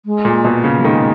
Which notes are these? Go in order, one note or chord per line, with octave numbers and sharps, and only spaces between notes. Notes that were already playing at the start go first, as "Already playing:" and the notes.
G#3
A#2
B2
C#3
F#3
D#3 G#3